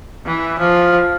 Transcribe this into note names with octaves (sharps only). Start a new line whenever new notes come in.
E3
F3